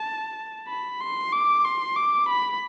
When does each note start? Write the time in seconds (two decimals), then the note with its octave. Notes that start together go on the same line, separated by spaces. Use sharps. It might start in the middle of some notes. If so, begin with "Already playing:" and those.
Already playing: A5
0.68 B5
1.00 C6
1.32 D6
1.64 C6
1.96 D6
2.29 B5